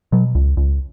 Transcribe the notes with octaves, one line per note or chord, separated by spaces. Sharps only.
B2 F#3
C#2
C#2